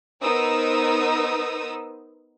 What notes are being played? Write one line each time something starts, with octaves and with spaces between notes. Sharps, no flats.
B3 D#4 A#4 C5 D#6 E6